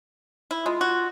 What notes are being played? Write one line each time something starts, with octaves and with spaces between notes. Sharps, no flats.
E4
G#3 F4
F#4